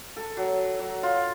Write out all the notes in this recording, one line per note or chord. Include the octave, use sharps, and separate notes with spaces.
A4
F#3
F#3
F4